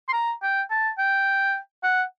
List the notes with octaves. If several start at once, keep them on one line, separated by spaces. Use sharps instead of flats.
C6
A#5
G5
A5
G5
F#5